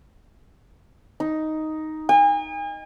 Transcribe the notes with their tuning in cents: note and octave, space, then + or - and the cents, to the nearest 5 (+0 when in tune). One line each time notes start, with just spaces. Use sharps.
D#4 +5
G#5 -40